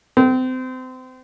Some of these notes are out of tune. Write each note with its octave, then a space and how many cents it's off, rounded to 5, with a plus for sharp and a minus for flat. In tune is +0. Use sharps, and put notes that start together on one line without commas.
C4 -30